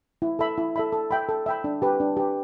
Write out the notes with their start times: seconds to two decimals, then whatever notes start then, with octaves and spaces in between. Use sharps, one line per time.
0.22 E4
0.39 A4 E5 B5
0.58 E4
0.76 A4 E5 B5
0.92 A4
1.11 E5 G5 B5
1.29 A4
1.46 E5 G5 B5
1.64 D4
1.82 G4 B4
2.00 D4
2.17 G4 B4